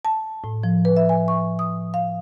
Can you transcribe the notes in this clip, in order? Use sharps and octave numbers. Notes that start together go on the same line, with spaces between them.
A5
A2
F3
B4
E5
G#5
C#6
D#6
F5